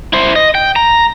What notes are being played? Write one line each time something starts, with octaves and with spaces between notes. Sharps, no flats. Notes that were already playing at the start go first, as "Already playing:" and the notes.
E4 C5
D#5
G5
A#5